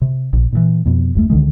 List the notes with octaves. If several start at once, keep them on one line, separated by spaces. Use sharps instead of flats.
C3
A#1
A#2 D3 E3
F2 B2
F#1 D#2 G#3 A3
C#2 D3 D#3 G#3